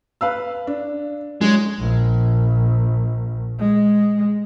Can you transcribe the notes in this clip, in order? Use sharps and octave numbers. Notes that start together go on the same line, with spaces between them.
B4 F5 E6
D4
F#3 G#3
A#1
G#3